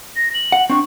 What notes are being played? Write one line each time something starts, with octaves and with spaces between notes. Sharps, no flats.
A#6
F#7
F#5
C4 D4 C#6